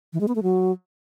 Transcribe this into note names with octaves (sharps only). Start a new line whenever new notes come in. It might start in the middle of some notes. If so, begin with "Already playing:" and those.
E3
G#3
B3
A3
F#3